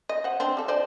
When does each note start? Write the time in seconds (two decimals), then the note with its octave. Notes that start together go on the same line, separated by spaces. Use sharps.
0.09 D#5
0.24 C5 F#5
0.40 C4 D4
0.57 G3 A4
0.68 C5 D5 D#5